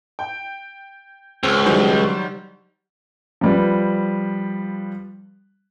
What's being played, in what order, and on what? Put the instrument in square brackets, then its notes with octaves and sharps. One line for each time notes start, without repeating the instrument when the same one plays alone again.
[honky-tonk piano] G5
[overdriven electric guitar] C#2 [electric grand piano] C4
[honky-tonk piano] D#3 G3 [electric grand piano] F#3 C5
[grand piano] F3 G3 B4